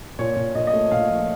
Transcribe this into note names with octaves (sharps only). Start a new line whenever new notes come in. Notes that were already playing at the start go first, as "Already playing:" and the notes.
A#2 C#5
A#2
A#2 D#5
D#5
A3
A#2 F5
F3